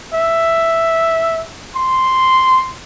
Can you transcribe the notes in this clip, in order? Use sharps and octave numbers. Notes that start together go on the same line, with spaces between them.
E5
C6